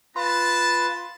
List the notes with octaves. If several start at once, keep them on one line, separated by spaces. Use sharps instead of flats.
B3 F4 B4 A5 C6